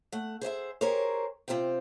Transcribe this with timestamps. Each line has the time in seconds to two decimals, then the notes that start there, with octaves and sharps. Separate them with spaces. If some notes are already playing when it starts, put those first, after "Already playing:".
0.12 A3 F#5
0.41 G#4 C5 D#5 E5
0.81 G4 G#4 A#4 C5 C#5
1.48 C3 C4 F4 C5 G5